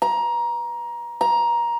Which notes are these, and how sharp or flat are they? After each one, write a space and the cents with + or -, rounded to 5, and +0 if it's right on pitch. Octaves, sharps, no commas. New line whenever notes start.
A#5 +20
A#5 +15